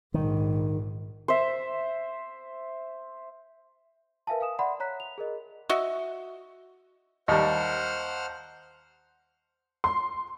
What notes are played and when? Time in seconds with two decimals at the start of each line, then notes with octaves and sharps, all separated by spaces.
0.14 A#1 G#2 D#3
1.28 C5 E5
4.27 A#4 B4 E5 F5 G#5 A5
4.40 F5 G#5 D#6 E7
4.59 D5 E5 F#5 B5 C6
4.80 C#5 A#5 F#6 B6
5.00 F7
5.18 G#4 A#4 D#5
5.69 F#4 D#5 E5
7.28 D#2 G3 C5 D#5 F#5 A5 F6
9.84 C6